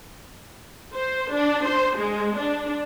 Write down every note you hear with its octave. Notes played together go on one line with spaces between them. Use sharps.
C5
D4
C5
G#3
D4